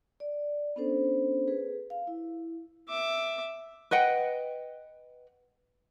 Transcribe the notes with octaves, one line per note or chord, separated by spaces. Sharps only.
D5
B3 C#4 D4 A4 C5
G#4 B4
F5
E4
E5 D6
B4 D#5 F#5 G5